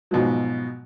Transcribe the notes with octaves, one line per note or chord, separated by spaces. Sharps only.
G#2 B2 F3 F#3